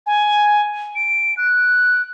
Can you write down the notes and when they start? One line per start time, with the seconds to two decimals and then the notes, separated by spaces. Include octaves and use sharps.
0.06 G#5
0.95 D7
1.37 F#6